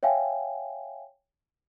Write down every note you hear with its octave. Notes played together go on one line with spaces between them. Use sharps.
C#5 E5 F5 G5 G#5